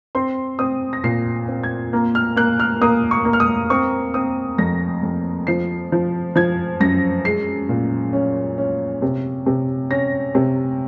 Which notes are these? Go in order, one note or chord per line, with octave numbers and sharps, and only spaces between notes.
C4 C6
C4 D#6
A#6
A#2 C7
C4
G#6
A#3
F6
A#3 F#6
F6
A#3 D#6
C#6
A#3
F6
D#6
C4 C#6
C4 D#6
F2 A#6
F2
F3 C7
F3
F3 G#6
F#2 A#6
G#3 C7
A#2
C#4
C#4
C3
C3
C#4 A#6
C3